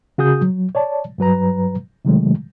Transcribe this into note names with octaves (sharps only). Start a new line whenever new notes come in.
C#3 F#4 G#4 D#6 G6
F#3
C#5 D5 A5
G2 F#3 B4 A#5
C3 D#3 F#3 G#3 A3